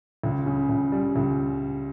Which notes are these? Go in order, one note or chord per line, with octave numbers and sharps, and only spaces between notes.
C#2
C#3
C#2
G3
C#2